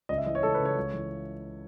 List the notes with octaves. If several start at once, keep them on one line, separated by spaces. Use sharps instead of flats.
C#2 D#5
E5
E3 D#5
C#5
C#2 A4
B4
C#3
C#5
C#2
E3